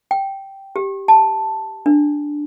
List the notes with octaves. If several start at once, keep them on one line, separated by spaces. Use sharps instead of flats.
G5
G4
A5
D4